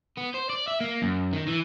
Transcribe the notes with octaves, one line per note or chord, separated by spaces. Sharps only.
B3
C5
D5
E5
A#3
F#2
D#3
E3